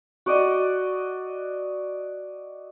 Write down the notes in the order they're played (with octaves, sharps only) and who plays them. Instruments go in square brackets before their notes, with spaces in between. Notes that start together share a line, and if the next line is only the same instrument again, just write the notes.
[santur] F#4 D5 D#5